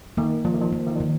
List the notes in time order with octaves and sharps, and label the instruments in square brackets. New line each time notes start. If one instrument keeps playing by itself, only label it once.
[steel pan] D#3 [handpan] A#3
[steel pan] F3 [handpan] A#3
[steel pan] D#3
F3
[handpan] A#3
[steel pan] D#3
F3
[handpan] D#3